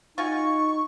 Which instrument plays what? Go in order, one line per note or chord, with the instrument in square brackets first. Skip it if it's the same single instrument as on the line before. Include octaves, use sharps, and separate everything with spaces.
[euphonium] D#4 [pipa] F4 F#4 G#5 [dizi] C#6